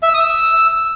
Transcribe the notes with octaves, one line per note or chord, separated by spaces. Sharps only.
E5
E6
D#6
E6